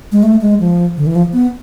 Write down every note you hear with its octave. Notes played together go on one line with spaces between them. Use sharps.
G#3
A3
G#3
F3
D3
E3
F3
B3